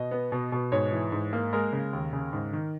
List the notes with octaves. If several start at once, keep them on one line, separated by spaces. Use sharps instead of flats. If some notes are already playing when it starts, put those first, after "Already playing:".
Already playing: B2 D#5
B3
B2
B2
G#2 C#5
E3
G#2
A#3
G#3 A#4
C#3
D#2
C#3
G#2
D#3